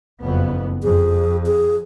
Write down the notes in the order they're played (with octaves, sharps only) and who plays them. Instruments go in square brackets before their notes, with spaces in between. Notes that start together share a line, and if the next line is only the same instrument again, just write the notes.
[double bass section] F#1 F2 B3
[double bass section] F2 [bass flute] G#4
[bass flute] G#4